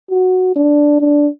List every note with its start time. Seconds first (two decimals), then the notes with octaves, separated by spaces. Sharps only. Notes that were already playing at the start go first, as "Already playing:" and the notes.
0.10 F#4
0.55 D4
1.01 D4